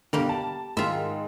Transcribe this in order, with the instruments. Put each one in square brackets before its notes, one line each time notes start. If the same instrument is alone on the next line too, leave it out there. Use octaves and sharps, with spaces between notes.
[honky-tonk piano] B2 D3 [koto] G3 A#3 G4
[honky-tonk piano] A5
[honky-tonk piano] G#2 D#3 [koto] F4 E5